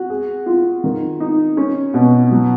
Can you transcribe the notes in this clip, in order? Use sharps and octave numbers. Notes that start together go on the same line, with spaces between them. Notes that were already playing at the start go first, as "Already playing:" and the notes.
Already playing: F#4
G#4
F4
D#3
D#4
C#4
B2
F#3